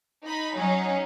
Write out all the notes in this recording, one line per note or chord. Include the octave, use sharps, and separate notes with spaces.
D#4 B5
F#3 C#4 D#4